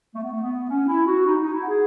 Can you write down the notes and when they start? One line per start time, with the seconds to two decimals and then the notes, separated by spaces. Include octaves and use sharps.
0.13 A3
0.22 B3
0.31 A3
0.41 B3
0.69 C#4
0.88 E4
1.06 F#4
1.25 D#4
1.39 D#4
1.52 E4
1.61 F#4
1.66 G#4